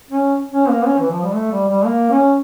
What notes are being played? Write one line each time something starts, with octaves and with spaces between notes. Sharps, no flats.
C#4
C#4
A#3
C#4
E3
F3
G3
A3
G3
G3
A#3
C#4